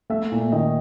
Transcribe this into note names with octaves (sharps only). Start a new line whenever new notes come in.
A3 E5
A#2
D#3 D#5